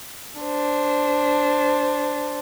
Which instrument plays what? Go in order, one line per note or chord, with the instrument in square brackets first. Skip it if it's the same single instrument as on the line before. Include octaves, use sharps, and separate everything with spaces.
[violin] D4 C5